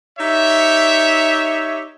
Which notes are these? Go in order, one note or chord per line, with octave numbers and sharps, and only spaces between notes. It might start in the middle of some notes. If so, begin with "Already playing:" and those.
D#4 G4 C#5 E5